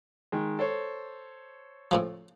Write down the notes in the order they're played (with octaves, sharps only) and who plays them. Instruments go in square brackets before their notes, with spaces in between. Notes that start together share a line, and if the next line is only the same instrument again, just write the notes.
[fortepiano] D#3 G#3
A4 C5 C#5
[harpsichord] A2 C#3 F3